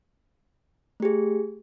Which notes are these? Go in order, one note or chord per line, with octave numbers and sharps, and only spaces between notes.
A3 G4 G#4